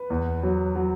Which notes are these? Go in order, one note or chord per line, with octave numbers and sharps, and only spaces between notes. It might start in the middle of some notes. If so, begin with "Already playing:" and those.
Already playing: B4
E2
F#3
F#3